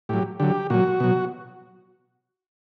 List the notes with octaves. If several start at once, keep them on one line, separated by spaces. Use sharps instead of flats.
A2 F#3 G4
D3 F#3 G4
A#2 F#3 F#4
B2 F#3